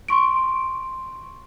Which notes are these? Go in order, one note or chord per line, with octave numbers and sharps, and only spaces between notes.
C6 C#6 D7